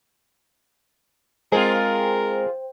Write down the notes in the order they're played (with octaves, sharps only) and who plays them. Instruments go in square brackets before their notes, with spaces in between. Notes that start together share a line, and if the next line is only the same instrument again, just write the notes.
[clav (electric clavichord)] G#3 C4 [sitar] F4 G#4 [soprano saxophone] A#4 [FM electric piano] C5 G5